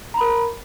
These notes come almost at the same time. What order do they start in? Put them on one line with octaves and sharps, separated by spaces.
A#5 B5 A#4